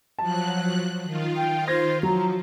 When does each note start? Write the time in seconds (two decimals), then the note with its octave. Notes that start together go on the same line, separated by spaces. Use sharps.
0.19 F3 F#3 A5 F#6
1.03 D#3 F4
1.37 G5
1.68 C5 G#6 A#6
2.03 F3 F#3 A#5